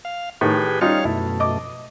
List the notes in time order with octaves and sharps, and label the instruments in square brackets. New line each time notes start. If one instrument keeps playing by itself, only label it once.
[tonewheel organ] F5
[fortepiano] A2 D#3 [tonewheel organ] G4 G#4 B4
[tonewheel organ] G3 C#5 F5 [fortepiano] C#4 D#4 F4
[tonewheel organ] F#2 B2 A3 [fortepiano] E4
[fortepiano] D#5 D6